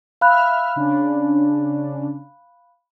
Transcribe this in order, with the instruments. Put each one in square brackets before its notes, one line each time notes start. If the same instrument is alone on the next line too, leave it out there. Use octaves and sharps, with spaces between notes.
[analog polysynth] E5 F6 [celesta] F5 B5 F#6
[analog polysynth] C#3 C#4 D4